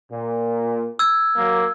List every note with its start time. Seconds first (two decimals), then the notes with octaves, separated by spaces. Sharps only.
0.11 A#2
0.99 E6 G#6
1.37 F#3 A#3